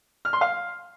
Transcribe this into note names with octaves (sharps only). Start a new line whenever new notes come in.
F6
C6
F5